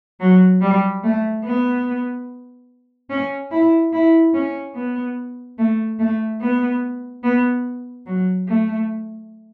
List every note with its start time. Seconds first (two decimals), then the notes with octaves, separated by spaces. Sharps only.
0.20 F#3
0.62 G3
1.04 A3
1.44 B3
3.10 C#4
3.51 E4
3.93 E4
4.34 C#4
4.75 B3
5.58 A3
5.99 A3
6.41 B3
7.23 B3
8.06 F#3
8.48 A3